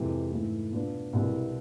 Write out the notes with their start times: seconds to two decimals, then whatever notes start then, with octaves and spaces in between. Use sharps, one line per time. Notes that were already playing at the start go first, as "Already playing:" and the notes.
Already playing: F2 C3 E3 G#3
0.31 G#2 E3 A3 E4
0.72 B2 B3 D4 F4 B4
1.13 C2 B2 G#3 B3 E4